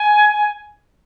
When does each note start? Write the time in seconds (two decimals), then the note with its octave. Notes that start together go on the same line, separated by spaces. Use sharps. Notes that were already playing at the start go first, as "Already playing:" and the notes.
Already playing: G#5
0.33 G#5